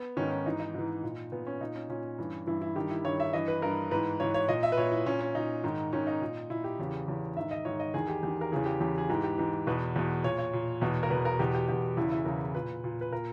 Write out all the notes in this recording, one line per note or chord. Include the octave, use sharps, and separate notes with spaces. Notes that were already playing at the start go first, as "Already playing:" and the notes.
Already playing: B3
G#2 D#3 C#4
C#4
G#2 E3 D#4
D#4
G#2 E3
A#2
A#2 B3
C#4
A#2 D#4
C#4
A#2 C#4
G2 E3
G2 E3 E4
E4
G2 D#3 G4
E4
G2 D#3 C#5
E5
G2 E3 D#5
B4
G2 E3 A#4
G#2 E3 B4
G#2 E3 C#5
C#5
A#2 D#5
E5
B4
A#2 C#5
E4
A#2 C#4
C#4
A#2 D#4
G#2 D#3
G#2 D#3 C#4
D#4
A#2
A#2 E4
G4
E2 C#3 E3
E2 C#3 E3
G#2 D#3 E5
D#5
G#2 D#3 C#5
D#5
E2 D#3 G#4
G4
E2 D#3 G4
A#4
E2 C#3 E3 G#4
G4
E2 C#3 E3 G4
G#4
G#2 E3 G4
G4
G#2 E3
E2 B2 B4
E2 B2
A#2 C#5
C#5
A#2
E2 B2
A#4
E2 B2 B4
A#4
E2 B2 G4
G4
E2 B2 G4
E2 C#3 E3 E4
E4
E2 C#3 E3 A#4
A#2 B4
A#2
B4
A#2 A#4